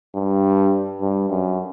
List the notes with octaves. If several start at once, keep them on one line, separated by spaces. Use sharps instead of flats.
G2
G2
F#2